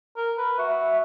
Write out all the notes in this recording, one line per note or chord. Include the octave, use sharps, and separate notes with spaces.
A#4
B4
F#4 E5